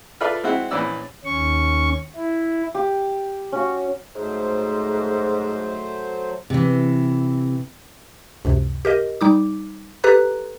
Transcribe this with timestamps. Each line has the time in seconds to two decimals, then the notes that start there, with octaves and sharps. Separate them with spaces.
0.21 F4 A4 B4 D5 E5
0.43 G#3 C4 E4 F#4
0.71 A#1 E3 C#4 D5 E6
1.25 D#2 C#4 C#6
2.16 E4
2.75 G4
3.52 C#4 F#4
4.16 G#2 F#3 A3 C5
6.50 C3 E3
8.45 C#2 F#2 C3
8.85 G4 A#4 D#5
9.21 G3 D#4 D6
10.04 G4 A4 B4 A#5 F#6